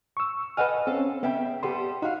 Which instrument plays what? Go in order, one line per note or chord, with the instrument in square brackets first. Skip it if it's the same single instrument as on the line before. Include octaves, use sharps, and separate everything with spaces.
[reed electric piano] C#6 E6
[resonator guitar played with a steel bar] A4 D#5 G#5 [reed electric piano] B4 F#5 F6
[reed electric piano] C4 C#4 [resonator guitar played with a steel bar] A4 F5
[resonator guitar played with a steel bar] C#3 E5 G5 [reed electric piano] B3
[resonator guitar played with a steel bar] G3 B3 A4 [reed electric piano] G4 C6
[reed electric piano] D#4 [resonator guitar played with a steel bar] F#4 F5